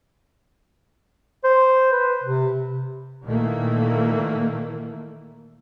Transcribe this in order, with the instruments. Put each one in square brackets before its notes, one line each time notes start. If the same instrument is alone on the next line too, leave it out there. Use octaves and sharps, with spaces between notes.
[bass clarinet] C5
B4
C3
[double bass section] A#2 D#3 E3 A3 A#3